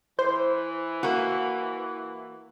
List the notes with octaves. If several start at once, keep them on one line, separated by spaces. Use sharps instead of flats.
E3 C5
A#3 F#4